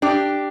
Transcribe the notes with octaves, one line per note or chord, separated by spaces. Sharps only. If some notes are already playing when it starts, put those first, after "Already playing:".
D4 G4